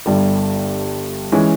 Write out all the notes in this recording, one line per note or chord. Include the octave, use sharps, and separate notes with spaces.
G1 G2 G3
E3 G#3 C#4